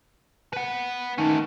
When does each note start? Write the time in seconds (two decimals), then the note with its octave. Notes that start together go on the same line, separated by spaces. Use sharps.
0.53 B4 F#5
1.18 D#3 A3 C#4